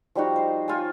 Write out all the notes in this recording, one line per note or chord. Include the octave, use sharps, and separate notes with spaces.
F3 G3 D#4 F#4
C5
F4 C5 C#5 G#5